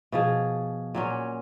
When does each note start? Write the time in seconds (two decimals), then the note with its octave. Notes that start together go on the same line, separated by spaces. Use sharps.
0.12 B2 F3 G#4
0.94 A#2 F#3 C#4